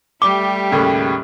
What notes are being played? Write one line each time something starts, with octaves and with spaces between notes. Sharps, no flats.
G3 A3 G4 D6 G7
D#2 A2 C#3